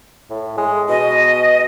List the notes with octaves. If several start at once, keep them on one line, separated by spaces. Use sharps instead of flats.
A2
G#3
B2 D#5